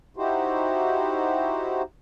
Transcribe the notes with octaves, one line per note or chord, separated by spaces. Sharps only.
D#4 E4 F#4 G4 C5